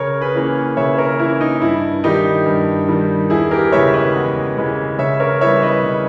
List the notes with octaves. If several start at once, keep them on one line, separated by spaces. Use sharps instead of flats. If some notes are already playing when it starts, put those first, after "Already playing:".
Already playing: C#3 A#4 C#5
G#4 B4
E3 A#3 C#4
C#3 C#5 E5
A#4 C#5
E3 A#3 C#4 E4
D#4
G2 E4
D#3 G3 D#4 G4
G2
D#3 G3
E2 E4 G#4
G4 A#4
C#3 E3 G#3 B3 C#5 E5
B4 D#5
E2
C#3 E3 G#3 B3
C#3 C#5 E5
A#4 C#5
E3 G3 B3 C#5 E5
B4 D#5
C#3